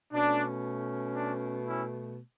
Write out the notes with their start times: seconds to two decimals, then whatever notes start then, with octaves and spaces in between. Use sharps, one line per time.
0.13 B2 A3 C#4 D4
1.16 D4
1.68 C#4 E4